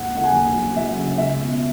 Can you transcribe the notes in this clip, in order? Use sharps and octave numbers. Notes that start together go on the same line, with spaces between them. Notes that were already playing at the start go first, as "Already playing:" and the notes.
Already playing: G#1 D#2 F#5
C#3 F#5
G#5
D#2
F#3
F#3 E5
C#3
C#2 E5
B2